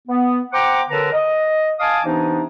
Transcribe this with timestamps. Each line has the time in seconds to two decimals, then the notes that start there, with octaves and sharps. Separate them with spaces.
0.08 B3
0.53 C5 F#5 G5 A#5 D6
0.89 F#2 D3 A#4 B4 A5 A#5
1.13 D#5
1.79 D#5 F5 G#5 A5 D6 D#6
2.04 C3 E3 B3 D4 D#4